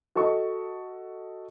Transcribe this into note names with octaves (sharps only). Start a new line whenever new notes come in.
F#4 A4 D#5 C#6